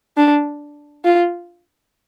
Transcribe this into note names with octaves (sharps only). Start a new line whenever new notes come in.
D4
F4